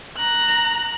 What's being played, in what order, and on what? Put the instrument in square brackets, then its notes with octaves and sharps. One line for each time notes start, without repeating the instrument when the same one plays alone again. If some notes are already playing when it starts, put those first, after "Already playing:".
[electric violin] A#5 F#6